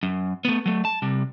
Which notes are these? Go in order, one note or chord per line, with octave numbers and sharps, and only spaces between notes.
F#2
A3 B3
F#3 A3
A5
C3 G3